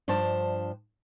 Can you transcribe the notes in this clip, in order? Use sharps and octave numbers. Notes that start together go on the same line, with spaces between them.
G2 F3 D4 C5 A5